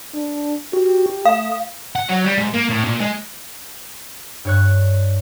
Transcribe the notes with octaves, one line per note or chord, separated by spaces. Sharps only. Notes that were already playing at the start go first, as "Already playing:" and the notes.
D4
F#4 G4
A3 F5 D#6
F#5
F#3
G3
G#2
A#3
A2
A#2
G#3
G2 C#5 F#6